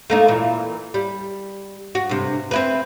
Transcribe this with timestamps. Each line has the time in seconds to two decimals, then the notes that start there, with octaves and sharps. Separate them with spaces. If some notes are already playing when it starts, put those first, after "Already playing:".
0.10 A3 A#3 D#4
0.28 A#2 E3
0.94 G3
1.95 F#4
2.09 G2 C3
2.51 C4 E4 B4